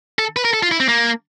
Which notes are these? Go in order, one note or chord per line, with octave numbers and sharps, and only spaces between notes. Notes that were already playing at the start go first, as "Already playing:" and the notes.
A4
B4
A#4
A4
F4
E4
C4
A#3